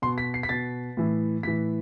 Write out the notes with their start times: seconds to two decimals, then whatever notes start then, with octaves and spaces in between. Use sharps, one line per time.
0.02 B2 C6
0.18 B6
0.34 C7
0.43 B6
0.49 B2 A6
0.97 A2 E3
1.43 A2 E3 B6